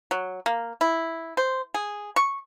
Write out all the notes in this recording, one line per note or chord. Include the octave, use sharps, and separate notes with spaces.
F#3
A#3
E4
C5
G#4
C#6